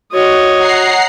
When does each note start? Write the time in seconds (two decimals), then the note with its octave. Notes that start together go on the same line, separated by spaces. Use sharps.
0.13 F#4 C#5 D#5
0.58 F#5 A#5 C7